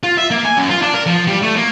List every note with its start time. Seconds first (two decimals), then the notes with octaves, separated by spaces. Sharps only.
0.03 F4
0.18 E5
0.31 A#3
0.45 G#5
0.57 F#2
0.70 F4
0.82 D4
0.94 A#4
1.06 F3
1.27 G3
1.42 A3
1.56 A#3